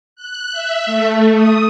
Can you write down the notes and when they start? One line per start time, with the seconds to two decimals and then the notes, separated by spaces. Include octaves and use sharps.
0.16 F#6
0.52 E5
0.86 A3
1.33 D#6